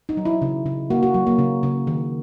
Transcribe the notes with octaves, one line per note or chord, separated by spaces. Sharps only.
D#4
F#3
E4
C#3
C#3
A#3 F#4
F#4
F#3
A#3
C#3
C#3
D#3